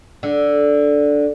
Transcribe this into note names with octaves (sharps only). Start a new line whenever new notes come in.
D3